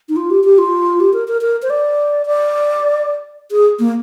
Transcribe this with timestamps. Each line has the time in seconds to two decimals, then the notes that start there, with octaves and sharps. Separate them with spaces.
0.09 D#4
0.16 F4
0.30 G4
0.44 G4
0.58 F4
1.00 G4
1.13 A#4
1.28 A#4
1.41 A#4
1.62 C5
1.70 D5
2.26 D5
3.52 G#4
3.79 A#3